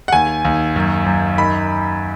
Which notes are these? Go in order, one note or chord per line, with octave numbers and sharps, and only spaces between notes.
F#5
D#2 G#5
D#2
F#2
F#2
D#3 B5